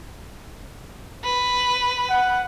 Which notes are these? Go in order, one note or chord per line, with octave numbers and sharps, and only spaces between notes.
B4
F#5